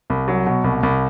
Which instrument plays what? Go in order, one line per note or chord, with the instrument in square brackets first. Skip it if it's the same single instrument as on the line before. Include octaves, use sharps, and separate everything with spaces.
[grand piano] C2
F#3
B2
C2
C2